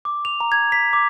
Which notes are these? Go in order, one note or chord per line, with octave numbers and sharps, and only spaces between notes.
D6
F7
A#5
G#6
B6
D6